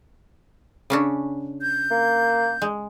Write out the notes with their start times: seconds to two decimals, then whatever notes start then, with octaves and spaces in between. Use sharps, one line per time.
0.90 C#3 C#4 D4
1.62 G6
1.91 A#3
2.62 G#3